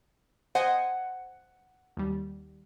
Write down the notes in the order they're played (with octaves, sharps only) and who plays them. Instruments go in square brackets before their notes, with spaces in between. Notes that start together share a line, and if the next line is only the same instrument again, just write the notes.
[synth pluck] C5 D#5 G#5 [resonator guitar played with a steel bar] F#5
[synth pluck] D#2 G3